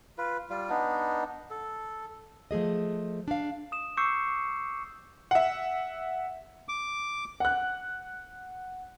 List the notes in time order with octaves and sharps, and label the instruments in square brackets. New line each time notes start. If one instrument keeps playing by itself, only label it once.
[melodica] F4 B4
G3 F4
B3 D4 D#4
A4
[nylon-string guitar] F3 A3 G#4 D#5
D4 F5
[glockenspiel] D#6 E7
C#6 D6 E6 G6 C7 C#7
[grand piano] E5 F#5
[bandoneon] D6
[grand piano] F#5 F#6